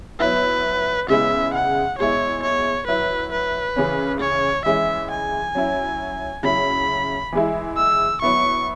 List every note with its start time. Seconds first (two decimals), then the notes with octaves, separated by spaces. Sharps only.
0.20 F#3 B3 E4 B4
1.10 C#3 G#3 B3 E4 E5
1.54 F#5
1.98 B2 G#3 E4 C#5
2.43 C#5
2.87 F#3 E4 B4
3.32 B4
3.76 C#3 E3 C#4
4.21 C#5
4.66 E3 G#3 C#4 E4 E5
5.11 G#5
5.55 F#3 C#4 E4
6.43 C#3 F#3 E4 B5
7.32 E3 G#3 E4
7.77 E6
8.22 F#3 B3 E4 C#6